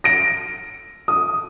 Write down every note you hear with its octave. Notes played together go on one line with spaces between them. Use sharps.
A#6 D7
D#6